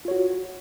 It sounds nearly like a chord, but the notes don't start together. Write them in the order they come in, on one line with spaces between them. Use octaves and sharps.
F4 C#5 F#4